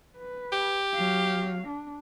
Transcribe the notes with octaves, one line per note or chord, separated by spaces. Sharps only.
B4
G4
F#3 F5
D4